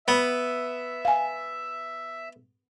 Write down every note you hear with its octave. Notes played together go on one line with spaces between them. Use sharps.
B3 E5 B5
F5 G#5